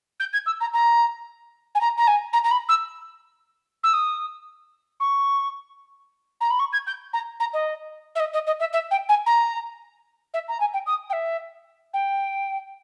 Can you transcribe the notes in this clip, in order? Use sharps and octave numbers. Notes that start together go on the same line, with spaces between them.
G6
G#6
E6
A#5
A#5
G#5
A#5
A#5
G#5
A#5
A#5
B5
E6
E6
D#6
C#6
A#5
B5
C#6
G#6
G6
A#5
A#5
D#5
E5
D#5
D#5
D#5
E5
E5
G5
G#5
A#5
E5
A#5
G#5
G5
D#6
G5
E5
G5